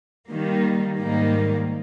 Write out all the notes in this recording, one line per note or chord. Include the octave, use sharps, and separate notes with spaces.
D#3 G3 A#3
G#2 D#3 G3 A#3